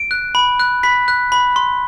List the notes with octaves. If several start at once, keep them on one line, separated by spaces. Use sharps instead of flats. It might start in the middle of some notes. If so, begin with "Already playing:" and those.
Already playing: D7
F#6
B5
F#6
B5 B6
F#6
B5
C6